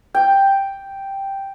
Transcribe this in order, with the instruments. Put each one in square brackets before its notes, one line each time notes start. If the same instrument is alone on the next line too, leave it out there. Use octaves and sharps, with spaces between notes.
[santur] G5